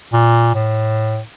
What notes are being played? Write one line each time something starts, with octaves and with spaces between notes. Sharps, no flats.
A#2
A2